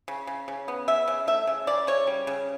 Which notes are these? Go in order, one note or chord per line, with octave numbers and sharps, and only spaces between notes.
C#3
C#3
C#3
B3
C#3 E5
C#3
A3 E5
C#3
C#3 D5
C#3 C#5
G3
C#3